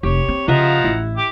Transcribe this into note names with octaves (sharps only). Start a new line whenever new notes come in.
F1 G4 C#5
C4
C#3 F3 F4 D#5 E5 F#5 A#5
A1 E4
G4 D6